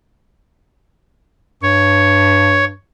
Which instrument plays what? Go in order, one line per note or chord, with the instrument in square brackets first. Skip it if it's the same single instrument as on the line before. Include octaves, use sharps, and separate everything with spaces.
[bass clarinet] G2 [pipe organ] C#5